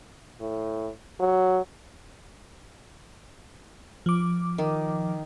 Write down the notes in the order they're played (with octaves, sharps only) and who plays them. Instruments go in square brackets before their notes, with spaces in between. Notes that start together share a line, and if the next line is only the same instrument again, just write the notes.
[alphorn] A2
F#3
[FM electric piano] F3 D6
[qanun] D#3